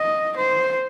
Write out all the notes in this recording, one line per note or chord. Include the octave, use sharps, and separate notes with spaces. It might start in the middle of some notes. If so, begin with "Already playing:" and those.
Already playing: D#5
C5